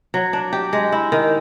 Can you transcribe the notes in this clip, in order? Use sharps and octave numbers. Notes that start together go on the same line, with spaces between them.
F#3
D4
G4
G#3
E4
D#3